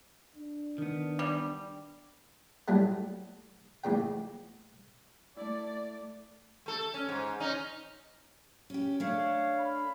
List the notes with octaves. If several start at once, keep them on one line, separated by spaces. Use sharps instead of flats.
D4
D#3 B3
G3
A2 F#3 G3 A3
A#1 A2 C#3 G5
A3 E4 D5
A3 A4
C#4
G#2
C#4 D#4
C#4 G4
A3 D4 C#5 F5
B5